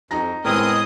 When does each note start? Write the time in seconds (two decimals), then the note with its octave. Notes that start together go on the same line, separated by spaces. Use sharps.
0.11 F2 D#4 A#5 A#6
0.44 A2 G#3 B3 C4 G#4 A#4 D#5 D#6